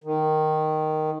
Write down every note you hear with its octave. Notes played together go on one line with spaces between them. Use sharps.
D#3